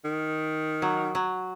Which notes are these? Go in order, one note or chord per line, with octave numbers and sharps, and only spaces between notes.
D#3
F#3
F#3